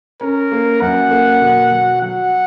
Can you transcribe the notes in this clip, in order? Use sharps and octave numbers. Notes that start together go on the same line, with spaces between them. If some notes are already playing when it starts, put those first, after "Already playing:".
C#4 A#4
A#3
F#2 F#5
A#3
B2
F#3
F#3 F#5